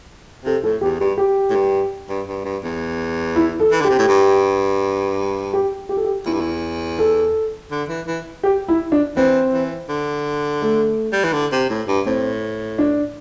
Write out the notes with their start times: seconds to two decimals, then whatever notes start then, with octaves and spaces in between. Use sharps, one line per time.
0.45 C3 A4
0.63 A2 A4
0.81 E2 G4
1.00 G2 G4
1.18 G4
1.50 A2
1.55 G2
2.09 G2
2.28 G2
2.45 G2
2.64 E2
3.36 E4
3.60 A4
3.71 E3
3.80 D3 G4
3.90 C3
3.99 A2
4.08 G2
5.53 G4
5.89 G4
5.97 A4
6.04 G4
6.25 E2 E4
6.33 G2
6.41 E2
6.99 A4
7.71 D3
7.89 E3
8.07 E3
8.43 G4
8.68 E4
8.92 D4
9.16 E3 C4
9.53 E3
9.89 D3
10.62 A3
11.13 G3
11.24 E3
11.33 D3
11.52 C3
11.70 A2
11.88 G2
12.06 A2 C4
12.78 D4